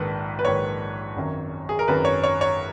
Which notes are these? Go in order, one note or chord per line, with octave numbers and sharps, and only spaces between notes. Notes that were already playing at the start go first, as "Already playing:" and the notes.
Already playing: A#1 G#2 D#3 B4
B4
A#1 G#2 D#3 C#5
G#1 F#2 D#3
G#4
A#4
G#1 F#2 D#3 B4
C#5
C#5
C#5